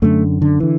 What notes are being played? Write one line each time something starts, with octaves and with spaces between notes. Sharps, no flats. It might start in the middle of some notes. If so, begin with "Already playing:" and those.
F#2 D3 A3
D3
D3 E3